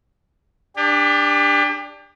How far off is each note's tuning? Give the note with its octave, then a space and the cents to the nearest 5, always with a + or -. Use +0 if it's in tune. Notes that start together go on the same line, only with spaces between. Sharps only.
D4 +5 G4 +35